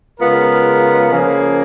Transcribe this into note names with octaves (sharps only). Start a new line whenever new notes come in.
C#3 G#3 B3 F4 A#4
C#3 F3 A#3 C#4 G#4